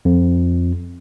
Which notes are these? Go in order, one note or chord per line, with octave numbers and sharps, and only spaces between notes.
F2